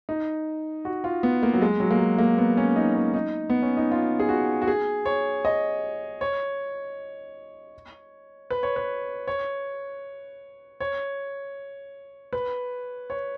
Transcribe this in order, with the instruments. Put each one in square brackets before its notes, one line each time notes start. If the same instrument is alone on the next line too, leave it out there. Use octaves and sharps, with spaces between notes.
[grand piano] D#4
F#4
F4
B3
A#3
F#3
G#3
F#3
A#3
G#3
A#3
B3
C#4
D#4
C#4
D#4
B3
C#4
D#4
F4
G#4
F#4
F#4
G#4
C#5
D#5
C#5
B4
C#5
B4
C#5
C#5
B4
C#5